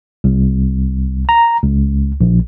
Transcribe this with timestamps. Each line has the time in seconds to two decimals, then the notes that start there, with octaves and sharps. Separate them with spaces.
0.24 C2
1.29 A#5
1.63 C#2
2.21 A#1